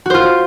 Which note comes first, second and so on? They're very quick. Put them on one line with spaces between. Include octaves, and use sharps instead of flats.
F#4 C5 F4